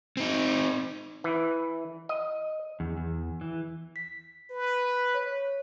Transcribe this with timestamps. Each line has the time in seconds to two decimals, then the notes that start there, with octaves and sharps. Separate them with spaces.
0.17 C4 D#4
1.24 E3
2.09 D#5
2.80 E2
2.97 E2
3.41 E3
3.96 B6
4.51 B4
5.14 C#5